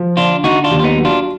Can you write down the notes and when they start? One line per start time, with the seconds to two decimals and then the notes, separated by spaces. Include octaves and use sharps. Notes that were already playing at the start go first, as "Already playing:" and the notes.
Already playing: F3
0.17 D3 D4 F4
0.44 D3 D#4 F#4
0.64 D4 F4
0.71 D#2
0.79 F4
0.84 B3 D#4
0.98 F#3
1.05 D4 F4